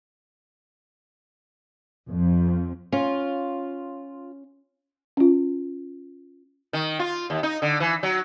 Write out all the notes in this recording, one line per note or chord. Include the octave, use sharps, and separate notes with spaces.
F2
C#4 F4
C#4 F4
D#3
F4
D#2
D#4
D3
E3
F#3